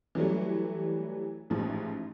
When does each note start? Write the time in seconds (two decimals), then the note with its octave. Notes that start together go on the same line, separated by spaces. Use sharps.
0.15 E3 F#3 G3 A3
1.50 A1 G#2 F3